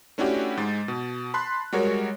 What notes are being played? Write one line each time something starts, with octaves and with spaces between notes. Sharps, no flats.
A3 C#4 D4 E4 F#4 G4
G#2 G#3 A6
B2
A5 B5 C6 F#6
G3 G#3 F#4 A#4 C#5